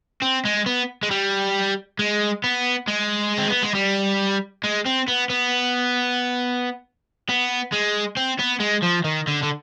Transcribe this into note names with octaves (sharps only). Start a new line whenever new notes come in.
C4
G#3
B3
G#3
G3
G#3
B3
G#3
C4
B3
G#3
G3
G#3
C4
B3
B3
B3
G#3
C4
B3
G#3
F3
D#3
D3
D3